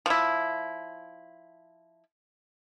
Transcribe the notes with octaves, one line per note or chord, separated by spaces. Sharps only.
F3 E4